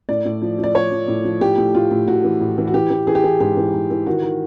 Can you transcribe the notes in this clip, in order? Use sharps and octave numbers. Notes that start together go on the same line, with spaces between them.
A2 D5
A2
F3
F3 D5
F3 C#5
F3
A2
F3
A2 G4
A2
A2 F4
A2
A2 F#4
E3
A2
E3
F#4
E3 G4
E3
E3 G#4
G4
E3 G#4
G#2 G4
E3
G#2
E3
D#3 F#4
D#3